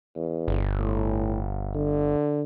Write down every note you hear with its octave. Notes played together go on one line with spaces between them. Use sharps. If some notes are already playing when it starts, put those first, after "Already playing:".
E2
G1
A2
D3